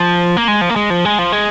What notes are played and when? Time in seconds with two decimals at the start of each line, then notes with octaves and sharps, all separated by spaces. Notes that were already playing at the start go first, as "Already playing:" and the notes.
Already playing: F3
0.37 A#3
0.48 G#3
0.61 F3
0.69 A#3
0.76 G#3
0.90 F3
1.05 G#3
1.19 F3
1.32 G#3